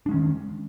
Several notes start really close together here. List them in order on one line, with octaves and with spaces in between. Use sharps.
D4 G#3 C#4 D#3